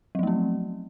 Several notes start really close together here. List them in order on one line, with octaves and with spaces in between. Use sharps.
F#3 F3 A3 C4